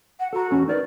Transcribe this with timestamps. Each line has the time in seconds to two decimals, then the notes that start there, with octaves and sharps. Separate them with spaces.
0.19 F#5
0.33 F#4 A4 A#5
0.51 E2 C#4 A4
0.68 D#4 A#4 B4 D5